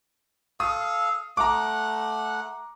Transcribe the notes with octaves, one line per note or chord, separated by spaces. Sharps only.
A4 F5 D#6
A3 F#5 A#5 D6